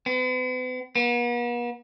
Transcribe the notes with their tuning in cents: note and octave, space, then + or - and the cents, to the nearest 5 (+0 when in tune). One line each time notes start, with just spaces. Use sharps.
B3 +45
B3 -45